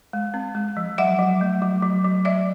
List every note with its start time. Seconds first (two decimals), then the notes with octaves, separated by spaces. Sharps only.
0.13 G#3
0.34 C4
0.55 G#3
0.77 F3
0.98 F#3 E5 F#5
1.19 F#3
1.41 A3
1.62 F#3
1.82 F#3
2.05 F#3
2.25 F#3 D5 E5